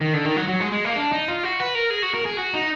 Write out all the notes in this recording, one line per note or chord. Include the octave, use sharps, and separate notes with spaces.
D#3
D3
D#3
F#3
F#3
G#3
G#3
A#3
D4
D#4
F4
F#4
B4
A#4
G#4
F#4
A#4
G#4
F#4
D#4